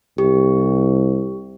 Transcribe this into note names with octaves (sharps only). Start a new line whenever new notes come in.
C2 G4